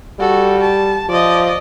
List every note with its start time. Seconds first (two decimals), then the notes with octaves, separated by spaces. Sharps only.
0.20 G3 F#4 A4
0.61 A5
1.09 F3 D5 D#5